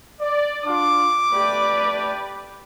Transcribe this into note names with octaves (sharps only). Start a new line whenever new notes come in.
D5
D4 F4 D6
A3 G4 B4 D5